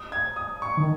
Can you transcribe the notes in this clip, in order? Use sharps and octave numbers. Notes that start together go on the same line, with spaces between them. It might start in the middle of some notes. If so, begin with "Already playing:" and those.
Already playing: D#6
G#6
D#6
C#6
D#3